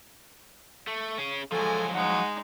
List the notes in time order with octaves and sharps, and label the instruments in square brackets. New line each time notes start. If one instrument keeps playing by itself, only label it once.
[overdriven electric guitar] A3
C#4 G#4
[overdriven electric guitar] F3 F#3 [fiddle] G#3 G#5 [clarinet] A4
[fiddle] G#3 D#4 [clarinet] F#5